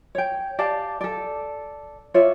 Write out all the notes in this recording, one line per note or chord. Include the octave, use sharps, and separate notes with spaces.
C#5 G5
G4 D5 F5 A5
A4 D5
F4 C#5 D5 E5